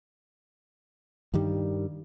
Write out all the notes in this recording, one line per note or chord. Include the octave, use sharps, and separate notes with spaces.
G2 D#3 G3